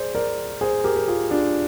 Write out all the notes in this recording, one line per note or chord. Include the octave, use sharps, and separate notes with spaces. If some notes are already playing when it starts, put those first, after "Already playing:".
Already playing: G#4 C5 D5
A#4 D5
G#4 C5
G4 A#4
A#4
F4 G#4
D4 F4